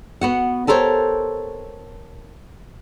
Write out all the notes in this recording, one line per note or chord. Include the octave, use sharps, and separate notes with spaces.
B3 F#4 F#5
G4 A4 A#4 C5 C#5